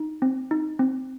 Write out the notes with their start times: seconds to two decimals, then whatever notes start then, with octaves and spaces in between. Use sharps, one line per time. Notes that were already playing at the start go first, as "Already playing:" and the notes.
Already playing: D#4
0.22 C4
0.51 D#4
0.79 C4